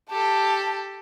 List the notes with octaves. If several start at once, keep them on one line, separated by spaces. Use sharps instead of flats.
G4 A4 A5